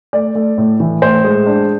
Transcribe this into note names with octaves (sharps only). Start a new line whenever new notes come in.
A3 D5
A3
A2
E3
A2 C5
G#3
D4